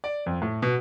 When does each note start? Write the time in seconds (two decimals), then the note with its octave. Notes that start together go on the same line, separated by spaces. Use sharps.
0.04 D5
0.26 F2
0.42 A2
0.62 B2